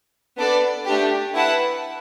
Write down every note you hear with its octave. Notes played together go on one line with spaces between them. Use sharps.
B3 D4 A4 D5
A3 D4 G4
E4 B4 F#5 A5